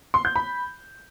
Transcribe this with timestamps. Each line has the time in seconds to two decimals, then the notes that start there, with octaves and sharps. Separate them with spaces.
0.14 C6
0.25 G6
0.36 B5